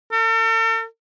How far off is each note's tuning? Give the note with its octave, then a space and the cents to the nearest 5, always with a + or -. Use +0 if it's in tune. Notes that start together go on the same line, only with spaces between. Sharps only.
A4 +45